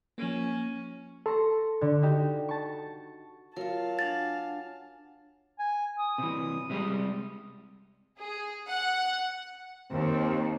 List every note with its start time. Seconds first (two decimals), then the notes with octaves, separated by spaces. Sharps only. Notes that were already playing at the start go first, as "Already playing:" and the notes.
0.18 F3 A#3 C#4
1.26 A4 C6 C#6 A#6
1.81 D3
2.02 D#4 F#4 G4
2.48 A5 C#6
3.57 F#3 F4 A#4 F5 A5
3.99 D4 F#5 G#5 A6
5.59 G#5
5.99 D#6
6.18 C3 E3
6.70 C3 G3 G#3
8.18 G#4
8.67 F#5
9.90 D#2 C4